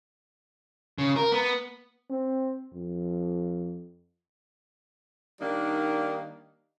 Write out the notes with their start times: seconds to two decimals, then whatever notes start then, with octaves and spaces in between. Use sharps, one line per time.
0.98 C#3
1.16 A#4
1.32 B3
2.10 C4
2.73 F2
5.40 D#3 G3 A#3 D4 D#4